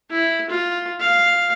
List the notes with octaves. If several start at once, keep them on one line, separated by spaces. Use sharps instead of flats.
E4
F4
F5